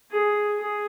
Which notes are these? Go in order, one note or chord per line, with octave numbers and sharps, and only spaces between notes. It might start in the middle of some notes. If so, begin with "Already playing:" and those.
G#4
G#4